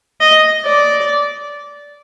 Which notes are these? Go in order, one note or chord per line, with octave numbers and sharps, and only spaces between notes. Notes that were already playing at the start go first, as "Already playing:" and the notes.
D#5
D5